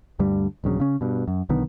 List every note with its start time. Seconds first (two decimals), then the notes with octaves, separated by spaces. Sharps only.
0.19 D2 G2 D3 G3
0.64 A#1 G2 C#3 F#3
0.80 C#3 C#4
1.01 G2 B2
1.28 F#2
1.49 B1 D3 D#3 B3